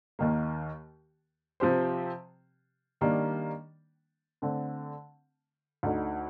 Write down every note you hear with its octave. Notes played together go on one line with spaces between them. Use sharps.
D#2 D#3 A#3
C3 F3 C4 G4 C5
D#3 G3 A#3 D4
D3 A3 C4
D2 D3 A3 D#4